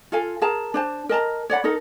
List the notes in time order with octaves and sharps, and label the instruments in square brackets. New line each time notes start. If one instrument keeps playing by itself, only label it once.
[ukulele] F4 A4 F5 G#5
G#4 A#4 A5 A#5
D4 C5 A5
A#4 D#5 A5 A#5
C#5 D5 F#5 B5
D#4 A4 A#4